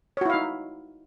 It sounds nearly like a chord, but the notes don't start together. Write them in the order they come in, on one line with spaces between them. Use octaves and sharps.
C#5 F#4 E4 F5 D#4